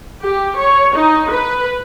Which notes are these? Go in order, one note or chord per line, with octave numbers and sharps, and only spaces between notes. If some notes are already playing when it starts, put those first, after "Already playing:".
G4
C#5
D#4
B4